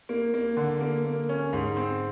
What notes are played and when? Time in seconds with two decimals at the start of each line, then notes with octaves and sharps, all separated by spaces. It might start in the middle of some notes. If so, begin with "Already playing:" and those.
0.09 A#3
0.34 A#3
0.57 D3
0.81 A#3
1.05 A#3
1.29 C#4
1.53 G#2
1.77 C4